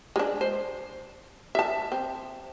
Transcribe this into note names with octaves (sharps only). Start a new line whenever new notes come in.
G#3 D4
C5
E5 A5
C4